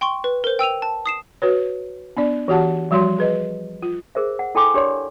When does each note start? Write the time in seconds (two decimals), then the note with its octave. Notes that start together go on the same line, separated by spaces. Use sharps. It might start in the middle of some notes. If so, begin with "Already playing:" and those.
0.01 G5 C6 C#6 G7
0.24 B4
0.44 A#4 C5
0.59 G5 E6 D#7 F7
0.82 A5
1.06 D#6 C7 E7
1.42 F#4 B4 C#5
2.17 B3 D4 D5
2.48 E3 F#4 G4 F#5 A5
2.91 F3 G3 F#4 C#5 C6
3.18 G#4 B4 D#5
3.82 F4
4.15 G#4 A#4 C5 E5
4.39 F#5
4.55 E4 A4 G5 G#5 C6 D6
4.74 D4 G4 A#4 C#5 D5 C6